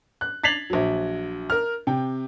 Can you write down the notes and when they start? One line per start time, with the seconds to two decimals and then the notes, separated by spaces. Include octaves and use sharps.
0.21 F#6
0.44 G#6 A6 B6 C7 F7 F#7
0.70 A#1 F#3
1.50 A#4 F6
1.87 C3 G5